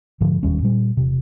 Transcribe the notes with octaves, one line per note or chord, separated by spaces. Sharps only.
G#2 D3 F3
E1 D#2 G3 C#4
A#2 G3
E1 C3